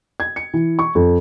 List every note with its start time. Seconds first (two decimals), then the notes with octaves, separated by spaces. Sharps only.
0.20 G#6
0.36 C#7
0.54 E3
0.79 C#6
0.95 F2